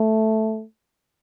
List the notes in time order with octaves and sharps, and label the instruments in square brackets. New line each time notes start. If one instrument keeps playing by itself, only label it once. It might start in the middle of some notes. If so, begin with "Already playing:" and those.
Already playing: [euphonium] A3